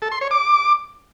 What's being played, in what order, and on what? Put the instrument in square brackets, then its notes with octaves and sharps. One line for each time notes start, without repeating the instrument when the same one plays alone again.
[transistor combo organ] A4
C6
C#5
D6